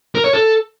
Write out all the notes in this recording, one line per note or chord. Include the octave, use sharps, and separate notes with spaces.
A#4
C#5
A4